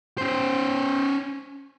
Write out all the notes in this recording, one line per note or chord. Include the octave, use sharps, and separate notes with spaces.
C#4 C5